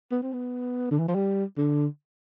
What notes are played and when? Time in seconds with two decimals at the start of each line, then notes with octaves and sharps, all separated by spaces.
0.11 B3
0.23 C4
0.33 B3
0.91 D3
0.99 E3
1.08 F3
1.15 G3
1.57 D3